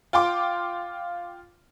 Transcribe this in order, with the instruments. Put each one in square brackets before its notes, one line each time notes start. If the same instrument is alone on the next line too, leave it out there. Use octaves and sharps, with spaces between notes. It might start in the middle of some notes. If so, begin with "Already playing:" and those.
[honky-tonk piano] F4 G5 C6 D6